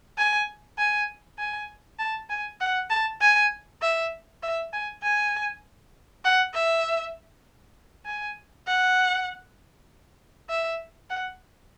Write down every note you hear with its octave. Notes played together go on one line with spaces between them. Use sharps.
G#5
G#5
G#5
A5
G#5
F#5
A5
G#5
E5
E5
G#5
G#5
F#5
E5
G#5
F#5
E5
F#5